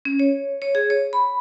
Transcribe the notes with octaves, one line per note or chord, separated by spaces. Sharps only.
C#4
C#5
C#5
G#4
C#5
B5